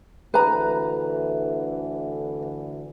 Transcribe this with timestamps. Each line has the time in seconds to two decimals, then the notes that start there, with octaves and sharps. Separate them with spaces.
0.34 D2 D3 E3 B4 A#5